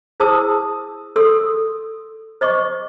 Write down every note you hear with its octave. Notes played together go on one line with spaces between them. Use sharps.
E4 G#4 C5 A5 D#6 E6
A4 C6 D#6 E6
C5 D#5 C#6 D6